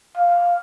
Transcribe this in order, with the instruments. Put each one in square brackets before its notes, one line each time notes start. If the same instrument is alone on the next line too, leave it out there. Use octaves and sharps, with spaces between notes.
[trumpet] F5